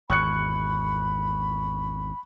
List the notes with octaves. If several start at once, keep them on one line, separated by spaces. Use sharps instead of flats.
G#1 E2 B5 C#6 F#6 C#7